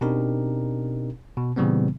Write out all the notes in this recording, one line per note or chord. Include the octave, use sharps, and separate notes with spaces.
B2 C4 D4 D#4 G4 A#4
B2
A#2 C#3 E3 G3 B3 C4